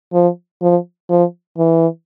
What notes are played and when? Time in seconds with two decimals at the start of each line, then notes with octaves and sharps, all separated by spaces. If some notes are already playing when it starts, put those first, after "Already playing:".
0.13 F3
0.62 F3
1.09 F3
1.58 E3